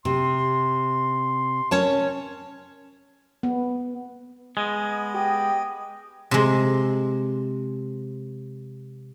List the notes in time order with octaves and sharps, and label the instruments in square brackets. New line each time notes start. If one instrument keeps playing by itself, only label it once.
[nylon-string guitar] C3 [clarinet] C6
[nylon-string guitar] C#4 C#5 A5 [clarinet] A#4
[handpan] B3
[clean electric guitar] G#3 [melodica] B3 D#5
[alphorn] G4
[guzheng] C3 G#3